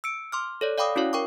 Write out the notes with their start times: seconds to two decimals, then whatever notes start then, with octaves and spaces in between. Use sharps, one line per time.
0.04 E6 C#7 D7
0.32 C6 D6 F6
0.61 A4 C#5 D5
0.78 D5 F5 G5 B5 D6 D#6
0.96 C#4 E4 F#4 C#5 F5
1.13 A#4 G5 C#6 D6